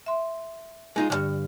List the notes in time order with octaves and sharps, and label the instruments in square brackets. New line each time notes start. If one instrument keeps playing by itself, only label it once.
[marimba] E5 C6
[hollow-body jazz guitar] G#3 D#4 F4
[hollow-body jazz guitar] B1 G2 [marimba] D3 F6